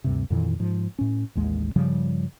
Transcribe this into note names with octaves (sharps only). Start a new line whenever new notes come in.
D2 G2 C3
F2 A#2 D#3 E3
G#2 F3
A2 C#4
A1 D#2 G#3
G2 C#3 F3 G3